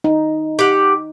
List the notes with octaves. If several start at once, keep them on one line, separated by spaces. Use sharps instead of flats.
D#4
G4 F#5